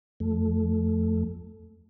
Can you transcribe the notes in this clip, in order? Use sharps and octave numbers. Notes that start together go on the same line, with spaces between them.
F2 A3